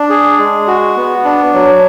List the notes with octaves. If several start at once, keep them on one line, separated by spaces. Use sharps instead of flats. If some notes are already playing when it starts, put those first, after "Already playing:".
Already playing: D4
G#4
G#3
F#4
B3
D4
F#3